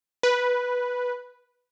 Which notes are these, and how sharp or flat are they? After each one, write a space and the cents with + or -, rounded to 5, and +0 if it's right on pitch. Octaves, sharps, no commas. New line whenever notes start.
B4 -5